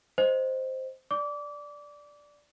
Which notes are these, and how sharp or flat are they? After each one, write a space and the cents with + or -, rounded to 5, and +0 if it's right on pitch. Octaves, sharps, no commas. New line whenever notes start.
C5 +0 D#5 +0
D5 +0 D6 -25